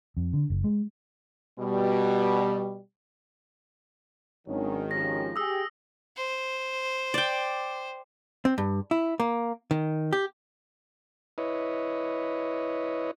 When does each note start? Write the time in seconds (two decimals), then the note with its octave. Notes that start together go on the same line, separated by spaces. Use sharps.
0.17 F2
0.33 D3
0.50 F#1
0.64 G#3
1.59 B2 G3
4.47 G#1 D#3 F#3 C#4 D4
4.91 F3 C#4 G4 A#6
5.36 G4 G#4 D#6 E6
6.17 C5
7.14 D5 G5
8.45 C4
8.58 G2
8.91 E4
9.20 A#3
9.71 D#3
10.13 G4
11.38 E4 B4 C#5 D#5